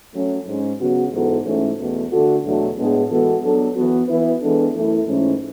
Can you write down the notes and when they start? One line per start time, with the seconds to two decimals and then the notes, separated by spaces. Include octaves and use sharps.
0.13 F#3 A3 C#4
0.46 G#2 G#3 C#4
0.79 C#3 F#3 B3 F#4
1.12 G#2 E3 B3 F#4 A4
1.45 G#2 E3 A3 C#4
1.78 E2 B2 A3
2.11 D3 A3 D4 F#4 A4
2.44 E2 B2 F#3 A3 D4
2.77 A2 G#3 B3 D4 G#4
3.10 E3 G#3 B3 F#4 A4
3.43 F#3 B3 D4 A4
3.76 E3 B3 F#4
4.09 E3 B3 E4 B4
4.42 E3 G#3 B3 D4 A4
4.74 F#2 E3 A3 E4 A4
5.07 G#2 E3 A3 C#4